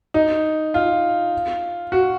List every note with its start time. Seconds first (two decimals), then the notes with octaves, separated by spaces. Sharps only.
0.14 D#4
0.74 F4
1.92 F#4